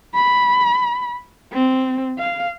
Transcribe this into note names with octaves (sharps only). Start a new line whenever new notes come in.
B5
C4
F5